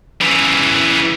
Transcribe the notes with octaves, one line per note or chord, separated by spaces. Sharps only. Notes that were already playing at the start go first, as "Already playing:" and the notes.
C#3 E3